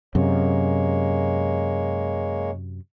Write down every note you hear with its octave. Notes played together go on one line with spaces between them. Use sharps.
F#2 C3 G#3 A#3 C#5